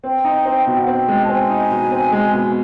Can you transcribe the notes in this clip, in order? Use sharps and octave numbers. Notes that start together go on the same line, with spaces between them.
C4 G5
D#4
C4
B2 G5
F#5
C4 G5
G#3
A5
C4 G#5
D#4
B2
C4
G#3
B2